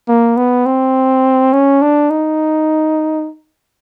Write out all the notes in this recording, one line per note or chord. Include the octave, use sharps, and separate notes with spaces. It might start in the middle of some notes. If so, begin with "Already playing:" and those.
A#3
B3
C4
C#4
D4
D#4